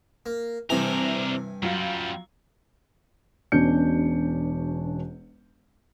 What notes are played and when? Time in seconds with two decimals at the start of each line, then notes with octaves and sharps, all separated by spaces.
0.26 A#3
0.70 G2 C3 E3 D4 A#4 G5 G#5
1.63 F#2 F#3 G3 F4
3.52 E1 B2 C#4 D4 G6 C#7